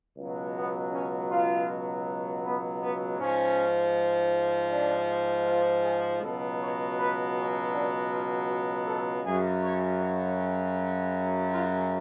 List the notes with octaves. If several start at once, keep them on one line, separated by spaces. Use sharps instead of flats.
C#2 B2 F#3
B3
C#4
F4
B3
B3
G#2 F3 C#4
D4
F4
G#4
C#2 B2 F#3 A4
C#5
B4
C#4
D4
F4
F#4
A4
F#2 C#3 F#3 G#4
C#5
C#5
F4